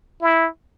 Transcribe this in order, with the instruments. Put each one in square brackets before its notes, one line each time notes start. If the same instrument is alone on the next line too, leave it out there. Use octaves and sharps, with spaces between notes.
[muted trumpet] E4